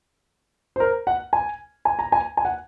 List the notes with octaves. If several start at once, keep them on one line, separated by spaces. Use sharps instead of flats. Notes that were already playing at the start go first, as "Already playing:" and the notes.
C5
A#4
F#5
G#5
G#5
A#5
G#5
G#5
F#5